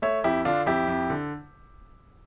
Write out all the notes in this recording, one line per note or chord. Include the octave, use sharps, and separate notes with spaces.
A3 C#5 E5
F2 E4 G4
D3 D4 F4
F2 E4 G4
F2
D3